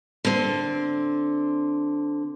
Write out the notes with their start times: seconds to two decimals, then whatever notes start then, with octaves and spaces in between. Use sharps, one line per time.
0.25 D3 C4